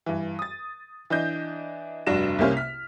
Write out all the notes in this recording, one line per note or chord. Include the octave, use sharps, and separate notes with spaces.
G2 E3
D#6 A6
E3 D4 D#5 G6
F1 G2 D4 F#4 A#6 E7
C2 C3 A#3 C#4 C5 F6
F6 B6